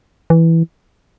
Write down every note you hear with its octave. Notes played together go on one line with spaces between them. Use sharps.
E3